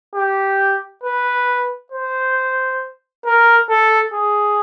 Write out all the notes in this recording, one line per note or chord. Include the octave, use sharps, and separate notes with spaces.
G4
B4
C5
A#4
A4
G#4